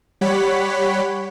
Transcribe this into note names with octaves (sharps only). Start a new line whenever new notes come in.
G3 G4 C#5 F#5 B5 B6